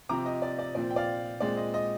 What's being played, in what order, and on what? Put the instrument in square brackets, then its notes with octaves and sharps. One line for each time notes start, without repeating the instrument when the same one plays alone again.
[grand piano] C3 F3 C4 A#5 D6
D#5
D5
D5
A#2 F3 C4 D5
G5
D5 F5
A#2 G#3 C4 D5
D#5
D#5